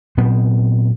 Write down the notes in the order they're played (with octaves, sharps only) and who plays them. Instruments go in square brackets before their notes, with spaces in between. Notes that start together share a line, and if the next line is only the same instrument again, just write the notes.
[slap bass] A#2 F#3 B3 C4